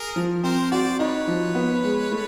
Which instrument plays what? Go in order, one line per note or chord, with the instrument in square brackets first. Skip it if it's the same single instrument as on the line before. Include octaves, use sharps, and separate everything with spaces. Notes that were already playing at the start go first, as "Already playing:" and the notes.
Already playing: [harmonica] G#4 A#4
[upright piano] F3
[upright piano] C4 [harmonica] A#4 C5
[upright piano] F#4 [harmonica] C5 D5
[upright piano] D#4 [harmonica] B4 C#5
[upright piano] F3
B3
G#3
A3